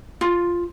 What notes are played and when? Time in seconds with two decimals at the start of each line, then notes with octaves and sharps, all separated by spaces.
0.21 F4